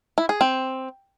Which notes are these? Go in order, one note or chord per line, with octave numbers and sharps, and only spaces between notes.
E4
G#4
C4